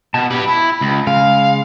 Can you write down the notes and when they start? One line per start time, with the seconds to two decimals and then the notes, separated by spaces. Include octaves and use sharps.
0.14 B2 A5
0.31 G4 B4 B5
0.48 E4
0.81 C#2
1.07 C#3 G#3 F5